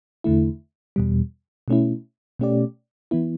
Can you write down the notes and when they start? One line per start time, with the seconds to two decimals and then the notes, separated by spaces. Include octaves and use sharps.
0.24 E2 D3 A3 E4
0.96 E2 B2 G3
1.68 B2 A3 C#4 E4
2.39 B2 A3 C#4 G4 D5
3.11 E3 B3 E4